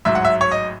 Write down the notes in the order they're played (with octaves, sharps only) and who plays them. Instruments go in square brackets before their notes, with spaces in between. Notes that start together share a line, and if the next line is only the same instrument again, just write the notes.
[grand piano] A1 G#2 F#3 E5
F#5
E5
C#5
D#5